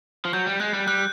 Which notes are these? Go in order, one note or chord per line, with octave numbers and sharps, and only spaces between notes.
F3
F#3 G6
G3
G#3 F#6
G3
G3 F#6